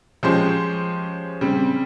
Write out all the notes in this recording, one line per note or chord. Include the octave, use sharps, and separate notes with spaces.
F3 G#3 C#4 G4 C5
C#3 G3 C4